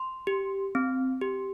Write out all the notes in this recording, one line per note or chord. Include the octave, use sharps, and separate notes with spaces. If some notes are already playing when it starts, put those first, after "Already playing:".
Already playing: C6
G4
C4
G4